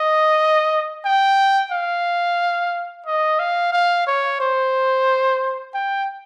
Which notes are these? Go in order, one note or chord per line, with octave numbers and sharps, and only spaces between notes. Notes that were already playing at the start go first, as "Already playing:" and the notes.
Already playing: D#5
G5
F5
D#5
F5
F5
C#5
C5
G5